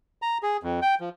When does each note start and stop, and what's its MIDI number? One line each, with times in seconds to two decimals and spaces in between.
0.22 0.38 82
0.43 0.57 68
0.63 0.80 41
0.82 0.95 79
1.00 1.09 53